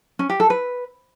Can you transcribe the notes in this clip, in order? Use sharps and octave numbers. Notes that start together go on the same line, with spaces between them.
C#4
G4
A4
B4